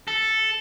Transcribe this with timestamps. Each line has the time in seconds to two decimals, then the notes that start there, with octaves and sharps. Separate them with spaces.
0.08 A4